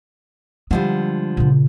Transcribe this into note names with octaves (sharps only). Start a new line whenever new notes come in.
D3 F3 G3 G#3
A#2 C#3